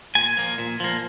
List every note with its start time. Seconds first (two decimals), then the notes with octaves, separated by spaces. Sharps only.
0.15 A#2 G#5
0.37 F3 A#3
0.58 A#2
0.80 F3 A#3